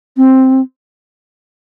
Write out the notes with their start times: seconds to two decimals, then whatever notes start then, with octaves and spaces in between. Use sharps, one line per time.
0.17 C4